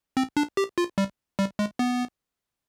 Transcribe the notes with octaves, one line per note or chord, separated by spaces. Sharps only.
C4
D4
G4
F4
G3
G3
G#3
B3